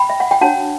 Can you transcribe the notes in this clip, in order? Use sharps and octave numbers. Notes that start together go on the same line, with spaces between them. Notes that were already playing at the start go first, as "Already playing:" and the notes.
Already playing: G5 B5
E5
F#5
G5
D4 F#4 C#5 F#5 A5